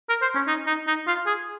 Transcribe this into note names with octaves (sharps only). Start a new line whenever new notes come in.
A#4
C5
C#4
D#4
D#4
D#4
F4
G#4